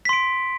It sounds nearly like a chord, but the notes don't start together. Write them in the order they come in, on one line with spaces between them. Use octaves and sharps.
B6 C6 D7